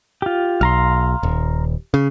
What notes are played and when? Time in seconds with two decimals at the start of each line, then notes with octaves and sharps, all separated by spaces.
0.22 F4 G4
0.61 B1 F5 A#5 C6
1.23 D#1
1.94 C#3